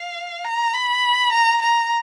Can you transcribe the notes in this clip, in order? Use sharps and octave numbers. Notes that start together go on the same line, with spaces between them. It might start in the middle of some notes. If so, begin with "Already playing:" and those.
Already playing: F5
A#5
B5
A#5
A#5